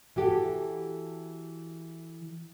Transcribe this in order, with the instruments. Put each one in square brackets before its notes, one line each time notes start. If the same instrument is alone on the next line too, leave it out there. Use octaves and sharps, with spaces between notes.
[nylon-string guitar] E3 F#4 G4 A4